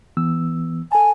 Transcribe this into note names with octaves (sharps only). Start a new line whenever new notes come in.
E3 B3 E6
A4 G#5 A5